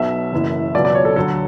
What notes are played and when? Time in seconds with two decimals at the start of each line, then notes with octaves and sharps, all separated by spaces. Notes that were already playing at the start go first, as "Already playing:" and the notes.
Already playing: B1 B2 F#3 E5
0.33 F#1 F#2 E3
0.74 C#2 B2 F#3 D5
0.85 D5
0.95 C#5
1.05 A4
1.16 D2 D3 F#3 A4